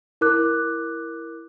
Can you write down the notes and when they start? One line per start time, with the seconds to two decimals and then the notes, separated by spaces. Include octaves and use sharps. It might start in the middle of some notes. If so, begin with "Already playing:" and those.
0.21 E4 A#4 D6 F#6